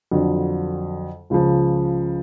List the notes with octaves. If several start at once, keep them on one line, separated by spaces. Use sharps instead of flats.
F2 D3 F#3
C#2 C#3 F3